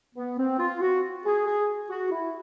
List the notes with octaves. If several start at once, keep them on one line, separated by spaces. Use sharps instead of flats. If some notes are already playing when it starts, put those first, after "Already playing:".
B3
C4
F4
F#4
G#4
G#4
F#4
E4